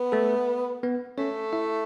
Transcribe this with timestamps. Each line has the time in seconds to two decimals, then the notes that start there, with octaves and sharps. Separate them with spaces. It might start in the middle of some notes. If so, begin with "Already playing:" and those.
Already playing: B3
0.12 A3 A4
0.83 B3 B4
1.18 A3 C#4 C#5
1.53 E4 E5